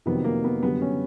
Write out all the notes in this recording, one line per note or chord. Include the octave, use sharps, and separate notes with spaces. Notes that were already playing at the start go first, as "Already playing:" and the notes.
F2 C3 D#3 F#3 B3
A#3
B3
F#2 D3 G3 B3
C#4